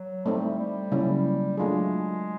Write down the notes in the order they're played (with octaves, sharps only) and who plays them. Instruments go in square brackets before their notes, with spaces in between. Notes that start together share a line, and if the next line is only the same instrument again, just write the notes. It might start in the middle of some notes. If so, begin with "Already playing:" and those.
Already playing: [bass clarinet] F#3
[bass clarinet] G3 [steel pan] A3 C4 D#4
[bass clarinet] G3
[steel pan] C#3 F#3 A#3 C#4 E4
[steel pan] F#3 A3 D4 F4 G#4 [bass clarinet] G#3